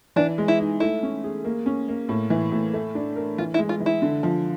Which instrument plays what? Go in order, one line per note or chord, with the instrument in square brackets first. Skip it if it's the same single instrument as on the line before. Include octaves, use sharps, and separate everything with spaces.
[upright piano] E3 [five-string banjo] D4
[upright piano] G#3
[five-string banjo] E4
[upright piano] D#4
[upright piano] A3 [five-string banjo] E4
[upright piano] C#4
G#4
A#3
C#4
A#3
A2
E3
A2
A3
D4
A#4
[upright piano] E3 [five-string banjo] F4
[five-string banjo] E4
[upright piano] G#3
[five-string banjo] F4
[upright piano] E3
[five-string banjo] E4
[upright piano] D3
F3